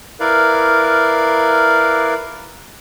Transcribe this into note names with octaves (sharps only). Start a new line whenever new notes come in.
E4 A#4 B4 D5 F5